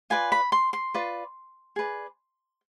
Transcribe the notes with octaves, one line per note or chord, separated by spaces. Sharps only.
F4 B4 D5 G#5
B5
C6
C6
F4 B4 D5
G#4 B4 D5